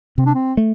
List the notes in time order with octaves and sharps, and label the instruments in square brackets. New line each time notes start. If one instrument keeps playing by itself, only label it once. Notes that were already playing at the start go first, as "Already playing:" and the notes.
[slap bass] C3 [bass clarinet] C4
[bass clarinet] D4
C4
[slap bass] A3